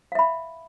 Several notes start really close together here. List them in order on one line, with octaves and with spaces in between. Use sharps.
F5 E5 B5